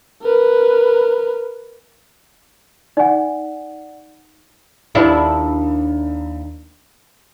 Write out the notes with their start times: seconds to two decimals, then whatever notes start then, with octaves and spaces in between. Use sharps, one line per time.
0.22 A#4 B4
2.97 D#4 D5 F#5 G#5
4.95 D#2 D4 E4